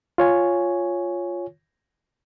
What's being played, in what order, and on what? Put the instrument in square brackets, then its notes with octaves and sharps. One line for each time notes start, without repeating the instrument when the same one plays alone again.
[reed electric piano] F4 C#5 G#5